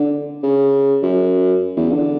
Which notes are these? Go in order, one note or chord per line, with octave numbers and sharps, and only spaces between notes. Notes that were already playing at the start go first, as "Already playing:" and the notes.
Already playing: D3
C#3
F#2
E2
D3